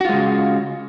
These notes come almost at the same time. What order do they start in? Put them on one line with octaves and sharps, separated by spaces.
F#4 F4 G#3 C#3